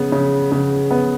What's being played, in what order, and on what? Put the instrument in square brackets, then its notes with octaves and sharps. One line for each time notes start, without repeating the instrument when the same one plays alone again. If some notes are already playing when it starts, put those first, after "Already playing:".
Already playing: [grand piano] C#3 B3
C#3
C#3
B3